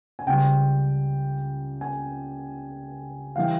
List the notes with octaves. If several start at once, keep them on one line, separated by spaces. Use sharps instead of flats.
G#5
C#2 C#3 G3 G5
G#5
E3 G3 F5
G5